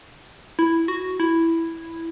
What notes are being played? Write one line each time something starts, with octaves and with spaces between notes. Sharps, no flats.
E4
F#4
E4